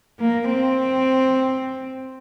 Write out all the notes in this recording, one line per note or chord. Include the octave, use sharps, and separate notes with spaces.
A#3
C4